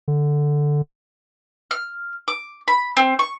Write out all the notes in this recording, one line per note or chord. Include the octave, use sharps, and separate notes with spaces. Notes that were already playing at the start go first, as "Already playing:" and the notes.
D3
F6
D6
B5
C4
C#6